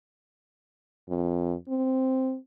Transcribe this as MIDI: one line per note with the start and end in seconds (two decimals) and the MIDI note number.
1.09 1.54 41
1.69 2.36 60